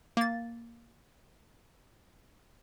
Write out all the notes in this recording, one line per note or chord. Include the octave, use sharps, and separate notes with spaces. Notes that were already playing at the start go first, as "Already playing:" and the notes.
A#3 A6